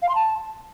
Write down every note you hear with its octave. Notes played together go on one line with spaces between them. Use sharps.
F5
C6
A5